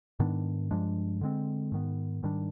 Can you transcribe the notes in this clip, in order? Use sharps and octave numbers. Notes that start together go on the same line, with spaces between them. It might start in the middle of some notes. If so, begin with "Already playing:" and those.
G#2 D#3 B3 D4
G2 F3 G#3 D4
D3 G#3 C4
G#2 D#3 B3
G#2 D#3 G3 D4